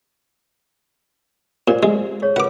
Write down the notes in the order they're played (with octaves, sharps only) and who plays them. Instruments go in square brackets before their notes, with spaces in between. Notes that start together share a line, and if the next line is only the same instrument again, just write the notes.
[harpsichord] A#2 [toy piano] C5 D5
[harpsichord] G#3
[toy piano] G#4 C#5
[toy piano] F4 A#4 B4 [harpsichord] F#5 D6